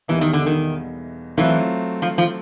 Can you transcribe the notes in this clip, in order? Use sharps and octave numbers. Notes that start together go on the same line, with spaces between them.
E2 B2 E3 G3 A#3 D#4
D#3
D3
D#3
E3 F#3 A3 C4 F4
F3
F3